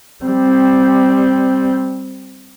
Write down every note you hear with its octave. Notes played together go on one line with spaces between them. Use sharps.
G3 C4